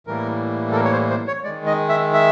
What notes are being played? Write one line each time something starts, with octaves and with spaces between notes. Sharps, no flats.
A2 E3 G3 A#3 A#4
A4
A#4
C#5
C5
C5
C#5
D#3 G#3 D5
D#5
E5
E5